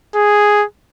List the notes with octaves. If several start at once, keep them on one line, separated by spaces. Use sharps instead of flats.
G#4